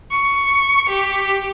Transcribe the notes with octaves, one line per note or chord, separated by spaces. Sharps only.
C#6
G4